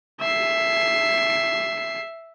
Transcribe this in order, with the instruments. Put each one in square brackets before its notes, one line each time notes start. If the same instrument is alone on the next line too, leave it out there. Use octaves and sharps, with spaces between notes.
[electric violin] E5 C7